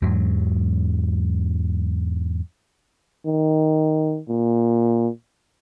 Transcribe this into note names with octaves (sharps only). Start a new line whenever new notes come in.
E2 G#2 F#3
D#3
A#2